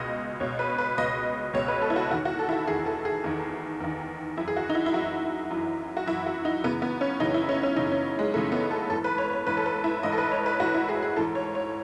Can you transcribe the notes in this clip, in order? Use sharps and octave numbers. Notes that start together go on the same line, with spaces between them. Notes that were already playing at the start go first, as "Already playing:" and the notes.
Already playing: C#2 B2 D#5
C#2 B2 C#5
B4
B4
C#2 B2 D#5
C#2 B2 C#5
B4
A4
E4
F#4
E2 D#3 F#4
F#4
A4
E4
F#4
E2 D#3 G#4
A4
G#4
E2 D#3
E2 D#3
F#2 E3 E4
G#4
F#4
D#4
E4
E4
F#2 E3 F#4
F#2 E3
F#4
F#2 E3 E4
F#4
D#4
F#2 C#3 E3 B3
B3
C#4
F#2 C#3 E3 D#4
E4
C#4
C#4
F#2 C#3 E3 D#4
C#4
G#3
F#2 C#3 E3 A3
B3
A4
G#2 E3 A4
B4
C#5
C#5
G#2 E3 B4
A4
B4
E4
G#2 E3 D#5
A4
B4
C#5
B4
G#2 E3 F#4
E4
G#4
G#4
G#2 E3 A4
C#5
C#5